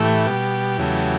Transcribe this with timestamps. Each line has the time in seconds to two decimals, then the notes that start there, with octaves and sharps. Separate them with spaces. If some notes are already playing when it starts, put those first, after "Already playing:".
Already playing: A2 E3 A3 G4
0.26 B2 G3
0.77 E2 C#3 F#3 A3